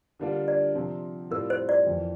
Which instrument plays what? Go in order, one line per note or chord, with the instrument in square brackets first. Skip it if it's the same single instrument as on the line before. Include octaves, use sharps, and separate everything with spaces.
[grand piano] D3 G3 A#3 D4 F4
[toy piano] D5
[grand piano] C3 F3 C4
[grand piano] A2 G3 C4 F4 [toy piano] A#4
[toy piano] C5
D5
[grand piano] F2 E3 A#3